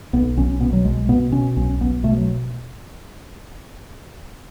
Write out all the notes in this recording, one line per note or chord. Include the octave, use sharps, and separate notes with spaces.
B1 B3
B1 C#4
B2 B3
F#3
B1 G#3
B2 B3
B2 C#4
B1 C#4
B1 B3
B2 A3
F#3